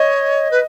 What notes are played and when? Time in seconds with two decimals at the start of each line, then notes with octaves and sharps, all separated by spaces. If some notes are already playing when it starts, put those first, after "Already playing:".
Already playing: C#5 D#5
0.51 B4